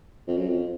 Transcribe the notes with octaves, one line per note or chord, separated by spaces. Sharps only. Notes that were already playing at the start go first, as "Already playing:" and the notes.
F2
F#2
F2